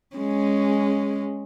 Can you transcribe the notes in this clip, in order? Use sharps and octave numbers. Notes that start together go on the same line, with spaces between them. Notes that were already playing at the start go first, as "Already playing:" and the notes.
G#3 C#4